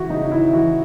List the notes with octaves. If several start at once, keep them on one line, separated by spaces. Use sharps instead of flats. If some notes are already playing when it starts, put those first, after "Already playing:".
Already playing: C#3 E3 E4 F#4
C#3 D#4
E4
E3 F#4